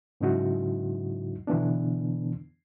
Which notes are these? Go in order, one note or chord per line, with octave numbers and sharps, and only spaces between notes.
G#2 C#3 F#3 D#4 E4 F#4
B2 D3 E3 B3 D4